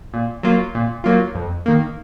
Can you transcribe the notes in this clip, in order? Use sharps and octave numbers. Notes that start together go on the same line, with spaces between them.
A#2
F#3 A#3 F4
A#2
F#3 A#3 F4
F2
D#3 A#3